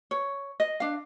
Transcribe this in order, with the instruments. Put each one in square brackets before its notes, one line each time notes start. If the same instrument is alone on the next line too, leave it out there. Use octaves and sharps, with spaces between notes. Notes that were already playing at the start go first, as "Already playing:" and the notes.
[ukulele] C#5
D#5
D4 F5